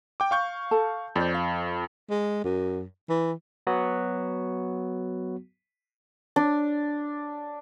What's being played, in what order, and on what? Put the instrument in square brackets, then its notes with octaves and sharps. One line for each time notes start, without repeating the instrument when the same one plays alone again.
[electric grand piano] G5 D6
F5 C#6 G6
[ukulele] A4 A5
[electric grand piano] F2 [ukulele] C5 D5
[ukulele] F5
[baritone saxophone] G#3
F#2
E3
[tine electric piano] F#3 B3 F#4
[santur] D4